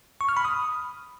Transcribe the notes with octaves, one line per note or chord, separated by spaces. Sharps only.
C#6
F6
B5
D#6